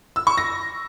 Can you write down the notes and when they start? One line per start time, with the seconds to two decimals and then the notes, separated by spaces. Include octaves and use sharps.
0.16 E6
0.27 C#6
0.38 A#6